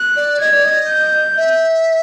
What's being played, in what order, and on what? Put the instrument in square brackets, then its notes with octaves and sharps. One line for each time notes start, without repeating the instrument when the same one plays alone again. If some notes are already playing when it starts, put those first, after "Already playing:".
Already playing: [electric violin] F#6
[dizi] D5
[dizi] D#5 [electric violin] G#6
[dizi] D5
D#5
[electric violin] G6
[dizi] E5